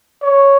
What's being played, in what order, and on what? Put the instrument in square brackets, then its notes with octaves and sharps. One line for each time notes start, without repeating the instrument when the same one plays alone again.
[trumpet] C#5